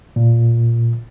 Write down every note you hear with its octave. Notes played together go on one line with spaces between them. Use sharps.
A#2